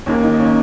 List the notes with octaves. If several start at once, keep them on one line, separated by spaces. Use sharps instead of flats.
D#2 D#3 A#3 C#4
D#4
C#4